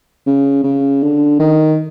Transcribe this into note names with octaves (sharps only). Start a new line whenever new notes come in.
C#3
C#3
D3
D#3